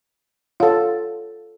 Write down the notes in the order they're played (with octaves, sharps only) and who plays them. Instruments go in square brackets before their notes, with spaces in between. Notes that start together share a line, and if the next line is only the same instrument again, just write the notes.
[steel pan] F4 A4 [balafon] C#5 F5 F#5